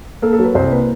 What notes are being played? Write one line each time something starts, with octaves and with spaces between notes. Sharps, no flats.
A#3 A4
A4
F#3
B4
C2 C5
A#3 B4